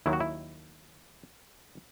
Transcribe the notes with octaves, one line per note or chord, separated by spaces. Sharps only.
D#2 D#3 F#3 E4
F#4
E4